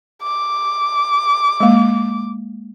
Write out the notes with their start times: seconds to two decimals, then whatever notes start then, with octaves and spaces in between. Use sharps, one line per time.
0.23 D6
1.60 G#3 A#3